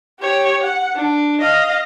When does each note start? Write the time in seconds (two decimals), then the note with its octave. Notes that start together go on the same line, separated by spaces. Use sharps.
0.20 G4 C#5
0.64 F#5
0.95 D4
1.41 D#5 F5